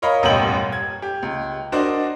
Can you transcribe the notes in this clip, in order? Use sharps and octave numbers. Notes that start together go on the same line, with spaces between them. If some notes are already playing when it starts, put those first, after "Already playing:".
A#4 C#5 D#5 F5 A#5 B5
D#1 A1 F#2 B2 G5 F#7
G#6
G4
C#2
D4 F#4 A#4 C5 D5 D#5